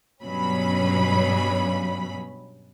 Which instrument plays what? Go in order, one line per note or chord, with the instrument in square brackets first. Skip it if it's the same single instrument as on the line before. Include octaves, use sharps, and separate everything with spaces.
[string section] G2 B2 F#3 C#4 B5